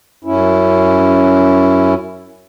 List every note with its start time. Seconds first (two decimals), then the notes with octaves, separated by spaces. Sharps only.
0.24 F#2 C#4 E4